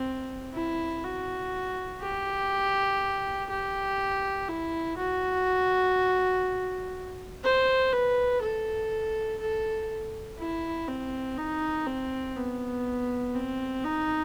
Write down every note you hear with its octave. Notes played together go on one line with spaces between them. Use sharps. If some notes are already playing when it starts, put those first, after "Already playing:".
Already playing: C4
E4
F#4
G4
G4
E4
F#4
C5
B4
A4
A4
E4
C4
D#4
C4
B3
C4
D#4